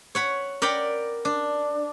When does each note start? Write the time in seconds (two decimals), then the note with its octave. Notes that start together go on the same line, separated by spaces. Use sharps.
0.15 C#5 F#5 B5
0.62 A#4 D5 F#5 G5 B5
1.25 D4